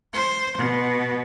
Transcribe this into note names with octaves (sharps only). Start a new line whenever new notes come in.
C5
B2